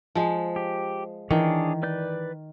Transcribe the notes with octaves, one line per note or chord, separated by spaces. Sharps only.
F3 G#3
G4
D#3 E3 D4 G#4 C#5
B4 D5 G6